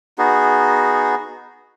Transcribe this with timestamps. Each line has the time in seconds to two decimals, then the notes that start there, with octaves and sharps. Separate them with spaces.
0.18 B3 D#4 F#4 G#4